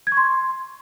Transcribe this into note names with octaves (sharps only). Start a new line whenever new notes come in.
G#6
C#6
C6